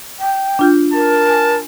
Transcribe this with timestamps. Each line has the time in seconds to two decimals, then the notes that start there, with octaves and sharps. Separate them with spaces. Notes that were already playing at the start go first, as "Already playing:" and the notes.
0.19 G5
0.59 D4 F4 G6
0.94 A#4 A5
1.29 G#5